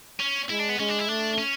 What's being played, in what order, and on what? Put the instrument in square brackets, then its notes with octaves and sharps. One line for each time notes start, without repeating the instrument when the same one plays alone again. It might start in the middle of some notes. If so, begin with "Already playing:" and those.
[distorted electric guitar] C#4
[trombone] G#3 [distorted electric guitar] E4
[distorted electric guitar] D4
B3
[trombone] G#3 [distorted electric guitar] C#4
[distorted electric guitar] D4
E4
[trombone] A3 [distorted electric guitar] D4
[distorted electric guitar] C#4